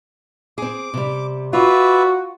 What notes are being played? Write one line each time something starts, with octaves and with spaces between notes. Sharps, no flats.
C4 G#4 D6
C3 G3
F4 F#4 B4 D5 E5